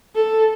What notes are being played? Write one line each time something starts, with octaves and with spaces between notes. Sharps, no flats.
A4